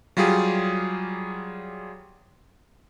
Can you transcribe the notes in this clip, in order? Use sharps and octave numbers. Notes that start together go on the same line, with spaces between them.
F#3 G3 F4 G4 G#4